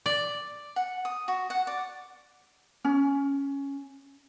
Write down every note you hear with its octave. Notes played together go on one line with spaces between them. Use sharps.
D5
F#5
D#6
F#4
F#5
D5
C#4